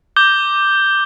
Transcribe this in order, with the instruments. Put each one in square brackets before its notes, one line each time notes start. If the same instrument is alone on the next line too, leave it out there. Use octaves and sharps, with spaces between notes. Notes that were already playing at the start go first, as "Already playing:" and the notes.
[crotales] D6 G6 G7